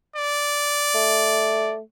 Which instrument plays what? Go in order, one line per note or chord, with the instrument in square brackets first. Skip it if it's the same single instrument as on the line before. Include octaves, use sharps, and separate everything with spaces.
[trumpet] D5
[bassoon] A3